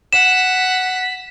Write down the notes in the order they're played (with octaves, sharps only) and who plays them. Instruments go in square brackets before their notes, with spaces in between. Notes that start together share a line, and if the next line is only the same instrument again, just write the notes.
[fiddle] F#5 [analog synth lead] B6 [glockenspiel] E7